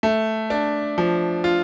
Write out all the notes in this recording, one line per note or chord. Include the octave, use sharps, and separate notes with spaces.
A3
D4
F3
F4